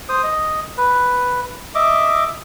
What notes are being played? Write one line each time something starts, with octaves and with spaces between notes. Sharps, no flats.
C5 D#6
D#5
B4
D#5 E5 D6